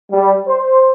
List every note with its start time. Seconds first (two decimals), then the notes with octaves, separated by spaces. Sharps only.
0.12 G3
0.48 C5